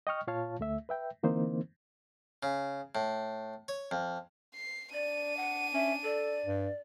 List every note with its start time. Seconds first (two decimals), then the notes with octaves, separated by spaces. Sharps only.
0.07 D#5 G5 C#6 F6
0.27 A#2 F4 C#5 F5 A5
0.60 D2 A3 E5
0.89 B4 E5 G5
1.23 D3 E3 A#3 C4 D#4 C5
2.43 C#3
2.95 A2
3.68 C#5
3.91 F2
4.55 C7
4.93 D4 D5 D#7
5.37 F#5
5.74 C#4 E5
6.04 A4 D5
6.46 G2